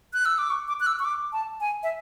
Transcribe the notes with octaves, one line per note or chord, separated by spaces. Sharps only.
F#6
E6
D6
C#6
D6
F#6
E6
C#6
D6
A5
G#5
E5